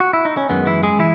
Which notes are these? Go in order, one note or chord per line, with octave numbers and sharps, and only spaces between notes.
F#4
E4
D#4
C#4
F#2 D#3 G#3 B3
E3 E4
G#3 G#4
E3 E4